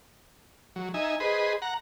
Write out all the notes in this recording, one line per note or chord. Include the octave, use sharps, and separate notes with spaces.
F#3
D#4 E5 G#5
G#4 B4 C5 D#5
F#5 A#5